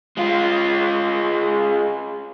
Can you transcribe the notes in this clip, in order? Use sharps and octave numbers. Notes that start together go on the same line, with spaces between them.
G#3 F4